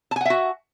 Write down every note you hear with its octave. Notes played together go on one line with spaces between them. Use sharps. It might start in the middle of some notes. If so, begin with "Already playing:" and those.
F#4 E5 F#5 G#5 A5